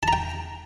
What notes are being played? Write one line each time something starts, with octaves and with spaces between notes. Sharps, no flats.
G5 A5 A#5